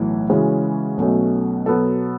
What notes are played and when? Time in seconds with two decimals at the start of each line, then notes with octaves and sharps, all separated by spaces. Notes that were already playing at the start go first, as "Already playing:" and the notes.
Already playing: B1 A2 E3
0.30 C#3 E3 G#3 C#4 F#4
0.97 B1 B2 A3 C#4
1.66 B2 F#3 B3 F#4 A4